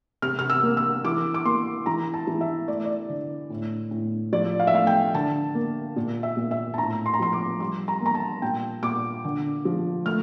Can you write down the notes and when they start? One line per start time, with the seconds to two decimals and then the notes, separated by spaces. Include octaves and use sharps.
0.22 C3 F6
0.39 F6
0.50 E6
0.63 A#3
0.77 E6
1.04 E3 D6
1.34 D6
1.45 A#3 C6
1.86 E3 A#5
2.14 A5
2.27 E3
2.41 E5
2.68 A3 D5
2.85 D5
3.09 D3
3.50 A2
3.91 A2
4.32 F3 D5
4.60 F5
4.67 E5
4.73 A3 F5
4.87 G5
5.14 D3 A5
5.55 A#3
5.96 A#2
6.23 E5
6.37 A#2
6.51 E5
6.74 A5
6.78 A2 A#5
7.06 C6
7.14 A#5
7.19 F3 C6
7.33 D6
7.60 G3 C6
7.88 A#5
8.01 A#3 A#5
8.15 A5
8.42 A#2 G5
8.83 A#2 D6
9.25 D3
9.65 F3
10.06 A3 F6